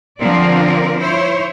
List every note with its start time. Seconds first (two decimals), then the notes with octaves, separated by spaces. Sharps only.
0.18 D3 F3 C4 A#4 D5
0.98 E4 C5 C#5